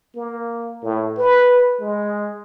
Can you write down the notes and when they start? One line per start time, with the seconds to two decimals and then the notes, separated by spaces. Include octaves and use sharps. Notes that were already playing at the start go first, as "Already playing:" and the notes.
0.15 A#3
0.82 A2
1.17 B4
1.80 G#3